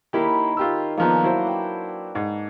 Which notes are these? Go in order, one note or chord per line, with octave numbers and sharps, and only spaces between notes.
D#3 A#3 E4 G4 C#5 B5
F4 G4 E6
D#3 F3 A#3 B3 D4
F#3 E4 C5
B4 G5
G#2